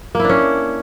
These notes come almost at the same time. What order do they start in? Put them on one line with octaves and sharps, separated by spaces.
A#3 E4 D4 C#4